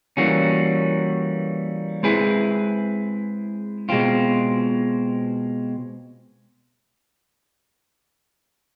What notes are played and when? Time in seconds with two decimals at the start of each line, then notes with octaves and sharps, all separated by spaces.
0.17 E3 G3 A#3 C#4 F#4
2.03 G#3 C4 E4 G#4 B4
3.89 B2 G#3 C4 F4